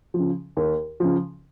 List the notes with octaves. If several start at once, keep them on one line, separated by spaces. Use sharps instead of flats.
F3
C#3
D#2
C#3 F3